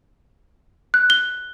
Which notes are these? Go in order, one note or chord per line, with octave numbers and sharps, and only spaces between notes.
F#6
G7